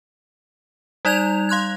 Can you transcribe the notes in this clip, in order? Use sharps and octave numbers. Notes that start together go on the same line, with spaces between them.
G3 D#4 D5 G6 G#6 F7
F5 C6 F#6 G#6